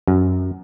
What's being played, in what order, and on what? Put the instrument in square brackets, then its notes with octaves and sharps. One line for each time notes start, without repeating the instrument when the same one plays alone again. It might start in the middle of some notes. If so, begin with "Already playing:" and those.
[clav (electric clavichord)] F#2